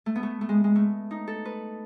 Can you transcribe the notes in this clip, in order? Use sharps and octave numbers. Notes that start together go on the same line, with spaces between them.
A3
B3
A3
A3
G#3
G#3
A3
D#4
A4
B4